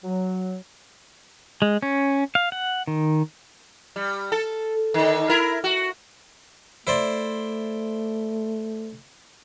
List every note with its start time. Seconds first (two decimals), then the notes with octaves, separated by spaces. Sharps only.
0.03 F#3
1.62 G#3
1.82 C#4
2.35 F5
2.52 F#5
2.87 D#3
3.96 G3
4.32 A4
4.94 D3 D#3
5.29 E4 A#4
5.64 F#4
6.87 A3 E4 C5 D5